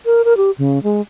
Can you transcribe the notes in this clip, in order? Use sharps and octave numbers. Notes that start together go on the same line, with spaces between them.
A#4
A#4
G4
C#3
G#3